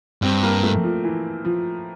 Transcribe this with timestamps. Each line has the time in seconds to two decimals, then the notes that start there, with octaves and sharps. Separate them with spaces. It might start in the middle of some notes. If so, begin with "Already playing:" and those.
0.22 G2 C4
0.43 A#3
0.63 A3
0.84 F3
1.04 E3
1.45 F3